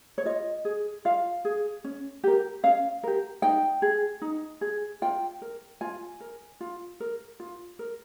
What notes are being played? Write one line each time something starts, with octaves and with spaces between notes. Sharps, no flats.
C#5
F4 D#5
G#4
F4 F5
G#4
C#4
G4 A#4
C#4 F5
G4 A#4
D#4 G5
G#4
D#4
G#4
F4 G5
A#4
F4 G#5
A#4
F4
A#4
F4
A#4